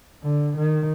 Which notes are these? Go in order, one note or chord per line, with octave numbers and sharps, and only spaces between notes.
D3
D#3